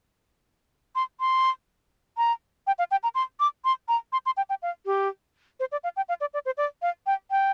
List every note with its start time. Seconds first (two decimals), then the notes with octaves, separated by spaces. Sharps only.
0.95 C6
1.20 C6
2.17 A#5
2.67 G5
2.79 F5
2.91 G5
3.03 A#5
3.15 C6
3.40 D6
3.65 C6
3.88 A#5
4.13 C6
4.26 C6
4.37 G5
4.49 G5
4.62 F5
4.86 G4
5.60 C5
5.72 D5
5.84 F5
5.96 G5
6.09 F5
6.21 D5
6.34 D5
6.46 C5
6.57 D5
6.82 F5
7.06 G5
7.31 G5